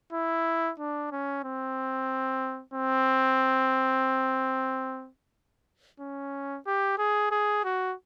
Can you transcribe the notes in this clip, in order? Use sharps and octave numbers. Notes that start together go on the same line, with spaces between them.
E4
D4
C#4
C4
C4
C#4
G4
G#4
G#4
F#4